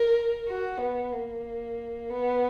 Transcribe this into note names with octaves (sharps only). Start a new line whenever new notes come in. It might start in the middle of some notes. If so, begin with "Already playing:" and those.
Already playing: A#4
F#4
B3
A#3
B3